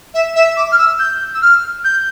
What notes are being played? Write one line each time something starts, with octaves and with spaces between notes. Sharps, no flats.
E5
E5
D6
F6
E6
G6
E6
F6
G6